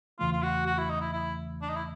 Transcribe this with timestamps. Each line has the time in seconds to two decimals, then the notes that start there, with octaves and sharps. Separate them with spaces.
0.19 E2 C#3 E3 A3 F4
0.32 F4
0.43 F#4
0.66 F#4
0.78 E4
0.90 D#4
1.01 E4
1.13 E4
1.62 D4
1.69 D#4
1.76 E4